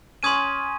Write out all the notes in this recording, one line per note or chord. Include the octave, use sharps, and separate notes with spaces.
C#4 C6 D#6 G#6 D#7